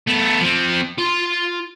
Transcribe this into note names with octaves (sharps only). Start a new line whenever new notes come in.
A3 B3
F3 C4
F4 C6